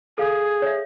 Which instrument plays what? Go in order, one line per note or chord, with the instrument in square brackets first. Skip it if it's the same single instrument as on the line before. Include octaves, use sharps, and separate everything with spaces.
[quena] G#4 [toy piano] A4 F5
[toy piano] C#5 E5